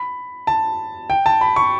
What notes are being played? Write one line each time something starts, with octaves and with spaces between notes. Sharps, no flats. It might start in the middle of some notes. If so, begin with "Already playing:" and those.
Already playing: B5
A5
G5
A5
B5
C#6